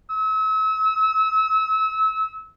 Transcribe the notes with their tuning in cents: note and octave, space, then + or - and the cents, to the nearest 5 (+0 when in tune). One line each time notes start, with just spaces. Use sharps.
E6 -35